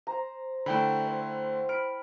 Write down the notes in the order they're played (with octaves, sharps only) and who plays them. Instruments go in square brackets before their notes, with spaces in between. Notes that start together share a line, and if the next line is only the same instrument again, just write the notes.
[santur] C5 A#5
[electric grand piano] D3 A3 [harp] E4 G5 B5
[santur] C5
[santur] B5 [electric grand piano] F6 [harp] D7